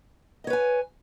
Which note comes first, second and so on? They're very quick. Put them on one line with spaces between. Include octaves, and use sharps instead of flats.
D#5 C#5 B4 G#5